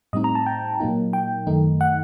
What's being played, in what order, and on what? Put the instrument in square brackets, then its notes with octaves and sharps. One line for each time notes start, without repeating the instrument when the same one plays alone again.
[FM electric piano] A2 G3 C4 D#4 D#5
A#5
A5
G5
A#2 F#3 A#3 D#4
G5
F#2 D#3 A3 D#4
F#5